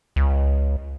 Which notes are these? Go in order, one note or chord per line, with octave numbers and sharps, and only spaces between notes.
C#2